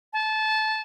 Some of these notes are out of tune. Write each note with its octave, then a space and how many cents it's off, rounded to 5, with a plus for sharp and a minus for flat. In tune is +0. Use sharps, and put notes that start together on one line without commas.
A5 -20